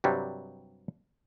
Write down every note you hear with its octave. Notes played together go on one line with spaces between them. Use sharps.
G2 C3 F#3 G3